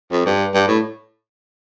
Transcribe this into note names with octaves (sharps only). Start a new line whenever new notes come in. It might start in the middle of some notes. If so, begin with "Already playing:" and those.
F2
G2
G2
A2